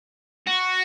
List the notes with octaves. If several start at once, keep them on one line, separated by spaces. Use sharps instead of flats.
F#4